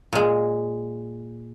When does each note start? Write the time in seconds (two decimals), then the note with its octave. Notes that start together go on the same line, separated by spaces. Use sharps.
0.13 A#2 G#3